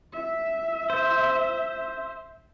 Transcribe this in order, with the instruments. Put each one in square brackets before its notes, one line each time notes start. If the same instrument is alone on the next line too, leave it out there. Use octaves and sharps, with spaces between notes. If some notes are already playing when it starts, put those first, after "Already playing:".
[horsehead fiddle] E5
[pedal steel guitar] C5